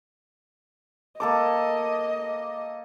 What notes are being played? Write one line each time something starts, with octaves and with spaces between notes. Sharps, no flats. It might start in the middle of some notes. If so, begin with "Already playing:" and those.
A#3 A4 D#5 D6